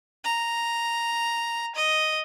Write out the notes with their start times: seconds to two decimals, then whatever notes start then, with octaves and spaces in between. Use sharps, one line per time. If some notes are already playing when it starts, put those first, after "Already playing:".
0.24 A#5
1.75 D#5